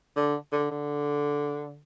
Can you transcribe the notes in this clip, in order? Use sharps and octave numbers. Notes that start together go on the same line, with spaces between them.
D3
D3
D3